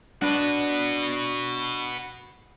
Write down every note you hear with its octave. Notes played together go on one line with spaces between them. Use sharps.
D4 F#4 B4